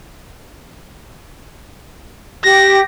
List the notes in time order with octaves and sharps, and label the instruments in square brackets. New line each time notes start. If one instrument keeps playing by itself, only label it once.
[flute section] G4 [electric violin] A#6